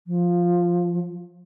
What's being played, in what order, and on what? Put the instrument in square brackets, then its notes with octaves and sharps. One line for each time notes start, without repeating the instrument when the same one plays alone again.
[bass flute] F3